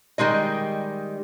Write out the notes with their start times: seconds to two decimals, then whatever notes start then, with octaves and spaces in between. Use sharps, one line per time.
0.18 D#3 G3 G#3 D#5